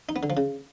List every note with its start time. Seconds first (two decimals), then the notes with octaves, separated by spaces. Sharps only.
0.09 D#4
0.16 B3
0.23 D3
0.30 F3
0.37 C#3